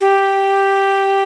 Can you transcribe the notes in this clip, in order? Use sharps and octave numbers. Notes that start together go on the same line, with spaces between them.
G4